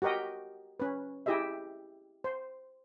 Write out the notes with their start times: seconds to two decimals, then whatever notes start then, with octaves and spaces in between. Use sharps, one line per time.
0.02 F#4 G4 A#4 D#5 G5
0.80 C#4 B4
1.26 E4 G4 G#4 D#5 E5
2.24 C5